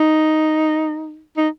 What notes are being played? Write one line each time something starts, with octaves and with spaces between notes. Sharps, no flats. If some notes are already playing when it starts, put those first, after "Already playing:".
Already playing: D#4
D#4